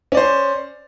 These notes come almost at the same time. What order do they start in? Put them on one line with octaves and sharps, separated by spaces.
C#4 D5 C5